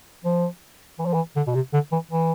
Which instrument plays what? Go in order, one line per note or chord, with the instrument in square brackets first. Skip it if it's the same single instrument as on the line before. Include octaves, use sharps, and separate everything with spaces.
[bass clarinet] F3
E3
F3
E3
D3
B2
C3
D3
E3
E3